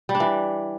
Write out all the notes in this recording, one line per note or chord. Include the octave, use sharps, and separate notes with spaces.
G3
D4
E3